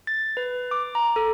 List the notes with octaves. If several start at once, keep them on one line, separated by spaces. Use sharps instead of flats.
A6
B4
D6
A#5
A4